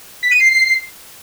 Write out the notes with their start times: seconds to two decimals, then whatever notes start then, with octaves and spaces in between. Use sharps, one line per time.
0.23 B6
0.31 D#7
0.39 C7